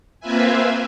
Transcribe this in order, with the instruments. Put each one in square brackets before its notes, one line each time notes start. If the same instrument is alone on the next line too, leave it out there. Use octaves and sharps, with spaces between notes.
[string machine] A#3 C4 F4 B4 E5 G#5